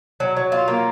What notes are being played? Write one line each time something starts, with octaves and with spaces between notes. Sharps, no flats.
F#3
F#3
F4
A#3